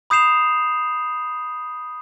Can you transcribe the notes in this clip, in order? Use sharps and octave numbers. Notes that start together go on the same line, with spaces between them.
B5 D#6 G6 C7 E7 F7